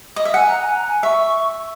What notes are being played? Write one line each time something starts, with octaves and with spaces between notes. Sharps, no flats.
D#5
E5
F#5 G#5
A#5
G#5
A#5
G#5
E5 C#6